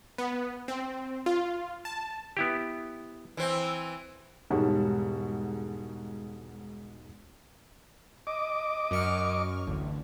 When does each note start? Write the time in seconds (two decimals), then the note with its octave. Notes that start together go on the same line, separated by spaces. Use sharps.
0.18 B3
0.68 C4
1.26 F4
1.85 A5
2.37 B3 E4 G4
3.37 E3 C4
4.50 E1 G#2 G3 F#4
8.27 D#5 D6
8.91 F#2 C#6 F6
9.67 A1 D2